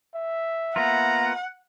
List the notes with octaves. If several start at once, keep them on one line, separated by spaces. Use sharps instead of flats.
E5
A#3 B3 F4 F#5 A#5